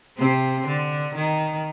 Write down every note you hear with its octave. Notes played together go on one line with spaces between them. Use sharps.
C3 C4
D3
D#3